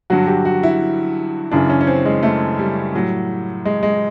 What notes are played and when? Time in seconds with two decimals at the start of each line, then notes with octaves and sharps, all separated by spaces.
0.10 G2 D3 F#3 F#4
0.27 G4
0.45 F#4
0.63 E4
1.51 F#2 C#3 E3 D4
1.70 C#4
1.81 C#4
1.87 C4
2.05 G#3
2.23 A3
2.59 G3
2.95 A2 F#3
3.65 G#3
3.83 G#3